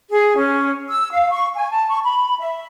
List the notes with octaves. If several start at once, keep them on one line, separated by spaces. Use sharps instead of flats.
G#4
C#4
E6
F5
C#6
G#5
A5
C#6
B5
E5